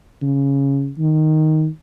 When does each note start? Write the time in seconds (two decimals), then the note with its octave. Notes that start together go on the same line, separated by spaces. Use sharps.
0.22 C#3
0.98 D#3